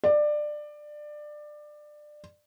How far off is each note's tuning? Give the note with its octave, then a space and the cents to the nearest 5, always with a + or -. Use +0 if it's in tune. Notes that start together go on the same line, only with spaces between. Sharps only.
D5 +20